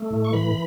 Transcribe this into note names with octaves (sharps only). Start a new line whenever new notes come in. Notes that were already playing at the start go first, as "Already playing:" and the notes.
Already playing: A3
A2
C#6
E3 B5